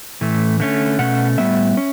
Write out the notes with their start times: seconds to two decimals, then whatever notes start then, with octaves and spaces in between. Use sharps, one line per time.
0.21 A2 E3 A3
0.60 D3 A3 C#4
0.99 B2 A3 C#4 F#5
1.38 A2 G3 B3 E5
1.77 C#4